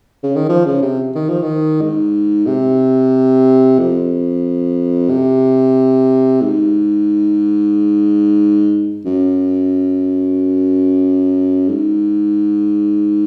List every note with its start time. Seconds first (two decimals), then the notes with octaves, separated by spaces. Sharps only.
0.23 C#3
0.36 D#3
0.49 F3
0.66 C#3
0.82 C3
1.15 D#3
1.29 F3
1.43 D#3
1.81 G#2
2.46 C3
3.79 F2
5.10 C3
6.42 G#2
9.05 F#2
11.69 G#2